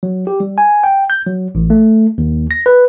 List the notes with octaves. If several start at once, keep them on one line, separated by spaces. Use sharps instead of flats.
F#3
G4
G3
G#5
G5
G6
F#3
A1
A3
D#2
A#6
B4